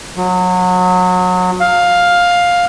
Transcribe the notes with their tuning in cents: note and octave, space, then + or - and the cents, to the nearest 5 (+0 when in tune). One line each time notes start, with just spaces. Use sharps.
F#3 -25
F5 +10